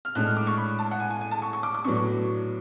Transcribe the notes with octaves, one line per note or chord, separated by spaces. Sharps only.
F6
A2 G#3 D4 F#6
F6
D6
C#6
B5
A5
F#5
G#5
G#5
G#5
A5
C#6
C#6
D6
D6
A2 F#3 B3 D4 C#6
C#6